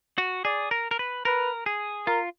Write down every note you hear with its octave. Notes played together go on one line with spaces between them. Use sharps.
F#4
G#4 D5
A#4
A#4
B4
A#4 B4
G#4
F4 A#4